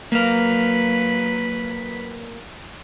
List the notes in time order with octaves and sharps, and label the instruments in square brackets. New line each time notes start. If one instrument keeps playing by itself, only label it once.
[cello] F#3 B4 [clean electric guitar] A#3 F5